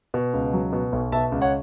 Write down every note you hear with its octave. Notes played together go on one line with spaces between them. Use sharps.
B2
C#2
F#3
B2
B1
B2 E5 A5
C#2
C#5 F#5